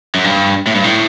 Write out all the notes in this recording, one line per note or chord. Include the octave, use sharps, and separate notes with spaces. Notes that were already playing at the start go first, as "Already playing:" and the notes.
F#2
G2
A2
G2
A2